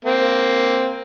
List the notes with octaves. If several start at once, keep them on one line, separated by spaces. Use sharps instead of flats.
A#3 C4